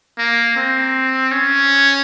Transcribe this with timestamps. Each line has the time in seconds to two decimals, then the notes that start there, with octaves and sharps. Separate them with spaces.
0.18 A#3
0.56 C4
1.32 C#4